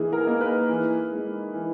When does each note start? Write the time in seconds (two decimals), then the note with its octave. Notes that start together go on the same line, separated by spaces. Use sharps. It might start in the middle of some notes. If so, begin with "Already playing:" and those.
Already playing: E3 A#3 D#4 G#4
0.13 A#4
0.26 A#3 D#4
0.40 G#4 B4
0.69 E3
1.12 G#3 D#4
1.54 E3